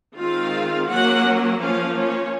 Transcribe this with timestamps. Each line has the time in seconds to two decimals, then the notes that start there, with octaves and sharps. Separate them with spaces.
0.18 D#3 G#3 C4 F4 F5
0.89 F#3 A#3 C#4 F#4 F#5
1.60 F3 A#3 C#4 F4 F5
1.95 C#4 C#5